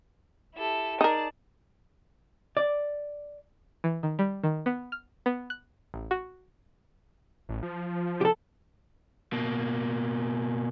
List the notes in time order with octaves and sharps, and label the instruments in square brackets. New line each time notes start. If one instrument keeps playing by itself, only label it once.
[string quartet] E4 G4 A4
[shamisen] D#4 A#4 [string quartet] G#4 D5 A5
[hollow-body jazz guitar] D5
[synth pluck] E3
D#3
G3
D#3
B3
F6
B3
F#6
A1
F#4
[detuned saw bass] A1
F3
[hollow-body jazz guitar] G4 A4
[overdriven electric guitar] B2 A#3